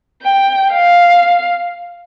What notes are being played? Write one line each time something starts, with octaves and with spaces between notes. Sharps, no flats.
G5
F5